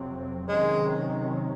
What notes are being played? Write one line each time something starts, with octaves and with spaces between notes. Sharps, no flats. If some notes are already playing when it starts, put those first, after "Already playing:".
Already playing: F2 C3 F#3 C4
C3 D#3 F#3 G#3 C#4